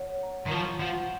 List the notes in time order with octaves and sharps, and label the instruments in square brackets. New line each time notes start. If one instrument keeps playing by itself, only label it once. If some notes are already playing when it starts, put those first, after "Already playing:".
Already playing: [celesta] C#5 F#5
A#5
[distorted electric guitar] D#3
[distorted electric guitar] F3 [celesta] C#6
[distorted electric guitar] F3 [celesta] F#5